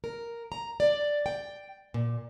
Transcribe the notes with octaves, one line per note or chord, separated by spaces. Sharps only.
A#4
A#5
D5
G5
A#2